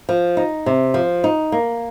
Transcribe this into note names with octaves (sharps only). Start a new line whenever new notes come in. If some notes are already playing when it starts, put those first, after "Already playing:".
F3
D#4
C3
F3
D#4
A#3